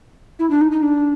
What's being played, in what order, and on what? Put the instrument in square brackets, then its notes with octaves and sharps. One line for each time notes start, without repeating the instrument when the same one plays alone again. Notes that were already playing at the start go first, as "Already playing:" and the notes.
[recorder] E4
D4
D#4
D#4
D4